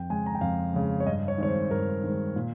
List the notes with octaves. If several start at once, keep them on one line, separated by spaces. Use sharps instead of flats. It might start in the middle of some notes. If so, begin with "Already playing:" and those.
Already playing: F2 G5
C#3 G#3 G#5
A#5
G5
F2 F5
C#3 G#3
C#5
G2 D#5
C#5
D#3 G#3 C4 C#5
C5
G2 A#4
D#3 G#3 C4
A#2